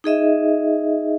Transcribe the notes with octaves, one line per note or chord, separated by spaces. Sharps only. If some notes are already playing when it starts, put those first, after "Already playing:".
D#4 G#4 D#5 E5